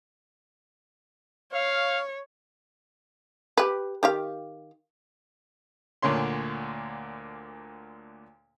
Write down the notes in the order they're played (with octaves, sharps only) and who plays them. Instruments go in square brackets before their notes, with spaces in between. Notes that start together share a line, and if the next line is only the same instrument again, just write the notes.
[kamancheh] C#5 [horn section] F5
[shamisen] G4 B4
D#3 G4 F5
[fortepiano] D2 A#2 D3 C#5 C6